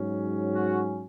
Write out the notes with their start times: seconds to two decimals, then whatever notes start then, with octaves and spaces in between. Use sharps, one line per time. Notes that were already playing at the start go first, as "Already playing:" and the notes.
Already playing: G#2 F#3 C#4
0.55 F#4